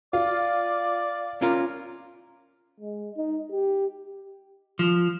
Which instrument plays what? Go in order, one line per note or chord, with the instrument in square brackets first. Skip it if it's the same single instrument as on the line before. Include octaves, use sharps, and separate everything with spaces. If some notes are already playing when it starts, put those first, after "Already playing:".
[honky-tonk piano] F4 [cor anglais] D5
[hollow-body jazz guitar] C#4 F4 A#4
[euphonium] G#3
D#4
G4
[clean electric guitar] F3